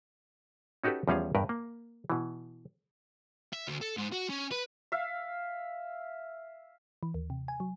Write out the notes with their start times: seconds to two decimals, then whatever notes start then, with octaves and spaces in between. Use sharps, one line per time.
0.84 C#4 D#4 F#4 G4 A4 B4
1.08 E2 F3 G3 C#4 G#4 F5
1.35 E2 G2 A#4 B4 G5
1.49 A#3
2.10 B2 E3
3.53 E5
3.67 D2
3.81 A4
3.97 G#2
4.13 F#4
4.30 C#4
4.52 B4
4.92 E5 F5
7.03 E3
7.14 D#2
7.30 C3
7.48 G#5
7.60 F#3